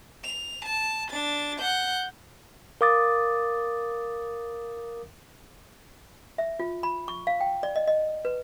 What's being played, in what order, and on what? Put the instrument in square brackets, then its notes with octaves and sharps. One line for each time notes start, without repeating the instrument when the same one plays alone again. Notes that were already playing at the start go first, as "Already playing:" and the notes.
[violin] F7
A5
D4 A6
F#5 G6
[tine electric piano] A#4 F5 D6 D#6 A6
[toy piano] E5
F4
B5
C#6
F5
G5
D5
D#5
D#5
B4